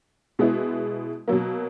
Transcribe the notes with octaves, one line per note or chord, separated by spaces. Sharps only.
B2 G#3 B3 E4
B2 F#3 A#3